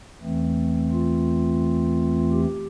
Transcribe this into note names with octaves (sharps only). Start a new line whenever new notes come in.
E2 E3 A3 C4
F4
G4